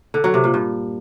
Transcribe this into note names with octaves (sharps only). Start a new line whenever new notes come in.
D3
F#3
C3
A#2
G2